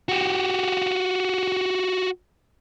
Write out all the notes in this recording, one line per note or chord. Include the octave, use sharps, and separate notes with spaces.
F#4 G4